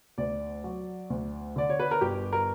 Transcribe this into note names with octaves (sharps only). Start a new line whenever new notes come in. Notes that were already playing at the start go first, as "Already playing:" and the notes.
D2 D5
F#3
D2
D3 D5
C#5
B4
A#4
G1 G4
A#4